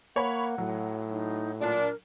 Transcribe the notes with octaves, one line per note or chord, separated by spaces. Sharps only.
A#3 C#5 F#5 B5
A2 F#3
D#4
A#2 D4 A#4